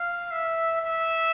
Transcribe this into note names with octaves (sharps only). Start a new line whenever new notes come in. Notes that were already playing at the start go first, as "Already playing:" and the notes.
Already playing: F5
E5
E5